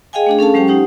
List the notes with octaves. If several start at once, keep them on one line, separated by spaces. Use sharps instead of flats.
G#4 D#5 F5 G5 G#5
A3 D4 G#4
C#4 A4 F5 A5
F#3 G#3 C#4 G4 C5 G5
D#4 G4 C5 F#5